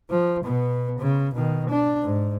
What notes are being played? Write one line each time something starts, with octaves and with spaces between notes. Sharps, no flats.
F3
B2 B3
C#3
B2 D#3
D4
G#2